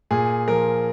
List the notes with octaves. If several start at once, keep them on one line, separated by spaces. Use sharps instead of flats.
A#2 G#4
F3 A#4